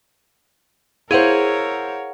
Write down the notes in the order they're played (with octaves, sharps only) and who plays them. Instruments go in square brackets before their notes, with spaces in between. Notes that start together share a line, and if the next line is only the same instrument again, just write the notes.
[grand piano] E4 C5 [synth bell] G#4 F5 F#5 [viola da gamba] A#4 C#5